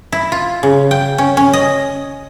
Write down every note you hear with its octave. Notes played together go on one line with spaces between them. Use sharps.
E4
F4
C#3
G5
C#4
C#4
D#5